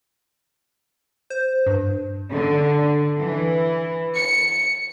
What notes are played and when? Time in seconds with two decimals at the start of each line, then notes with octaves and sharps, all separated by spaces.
1.30 C5
1.66 G2
2.32 D3
3.18 E3
4.16 C#7